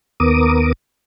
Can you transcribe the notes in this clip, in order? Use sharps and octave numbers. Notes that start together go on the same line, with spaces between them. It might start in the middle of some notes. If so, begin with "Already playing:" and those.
D#2 B3 A#4 D6 D#6